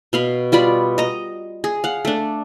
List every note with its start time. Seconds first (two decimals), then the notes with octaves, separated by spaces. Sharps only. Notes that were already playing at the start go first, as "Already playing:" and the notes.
0.13 B2 F5 B5
0.52 G3 F4 D5 B5
0.98 D#5 A#5
1.64 G#4
1.84 F5 F#5
2.05 A3 D4